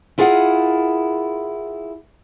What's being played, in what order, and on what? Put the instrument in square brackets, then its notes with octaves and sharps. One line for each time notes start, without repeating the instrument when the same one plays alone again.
[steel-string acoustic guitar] E4 F4 G#4 A#4 F5 F#5